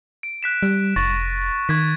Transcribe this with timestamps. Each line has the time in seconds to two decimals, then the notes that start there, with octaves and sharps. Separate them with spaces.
0.23 D7
0.43 F#6 B6 E7
0.63 G3
0.96 F1 C#6 A6 A#6
1.69 D#3 C#6 G#6 B6